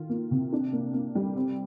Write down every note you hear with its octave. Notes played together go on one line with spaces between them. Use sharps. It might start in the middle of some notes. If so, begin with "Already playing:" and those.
Already playing: D#3 F4
A#3
C3
D4
A#3
A#3
G3
C4